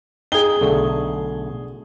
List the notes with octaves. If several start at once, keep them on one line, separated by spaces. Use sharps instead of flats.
D#4 G#4 G5 G7
B1 D3 A3